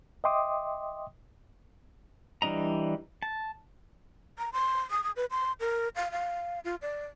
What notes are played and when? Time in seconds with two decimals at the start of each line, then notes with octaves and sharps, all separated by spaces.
0.24 D#5 E5 G5 C6 D6 D#6
2.42 E3 G3 D4 D#5 A#5
3.22 A5
4.38 A#5
4.53 C6
4.91 D#6
5.04 D#6
5.16 B4
5.31 C6
5.60 A#4
5.96 F5
6.12 F5
6.65 F4
6.82 D5